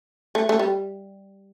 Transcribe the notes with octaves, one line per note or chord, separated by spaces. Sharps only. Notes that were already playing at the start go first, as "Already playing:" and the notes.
A3
A3
G3